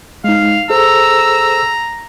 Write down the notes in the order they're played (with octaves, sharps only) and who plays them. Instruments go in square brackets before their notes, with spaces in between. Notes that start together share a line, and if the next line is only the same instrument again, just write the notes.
[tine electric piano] G#3 D#4 [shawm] F5
[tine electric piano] G#4 A4 C5 [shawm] A#5 [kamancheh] E6